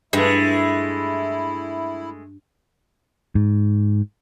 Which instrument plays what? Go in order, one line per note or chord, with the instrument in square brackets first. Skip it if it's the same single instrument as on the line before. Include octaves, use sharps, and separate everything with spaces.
[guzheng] G2 [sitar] G#3 A3 [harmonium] E4
[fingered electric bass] G#2